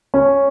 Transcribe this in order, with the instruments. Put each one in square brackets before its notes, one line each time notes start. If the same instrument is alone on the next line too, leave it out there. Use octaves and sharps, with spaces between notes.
[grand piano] C#4